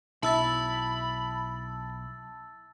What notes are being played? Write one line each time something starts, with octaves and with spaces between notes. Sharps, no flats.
B1 E4 A5 B5 E6 A6